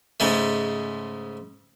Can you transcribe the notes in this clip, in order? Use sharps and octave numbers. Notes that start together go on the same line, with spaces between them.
G#2 C#3 G#3 A3